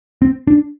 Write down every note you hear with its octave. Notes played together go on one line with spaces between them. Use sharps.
C4
D4